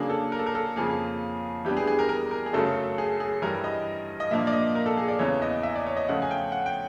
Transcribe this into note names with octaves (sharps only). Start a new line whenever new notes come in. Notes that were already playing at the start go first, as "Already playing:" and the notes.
Already playing: C#3 F#3 A#3 D4 G#4
A4
A#4
A4
A#4
A4
F2 C#3 F3 A#3 G#4
E3 G3 B3 D4 G4
G#4
G#4
A#4
A#4
A#4
G#4
F#2 C#3 F#3 A3 A4
G#4
G#4
G2 E3 G3 A#4
D#5
D#5
A#2 F3 A#3 D4 E5
D5
D#5
A#4
A4
G#4
D5
E2 C#3 E3 C#5
D#5
E5
D5
C#5
D#5
C#3 F3 A3 C#4 F4 F#5
G#5
G5
F#5
G5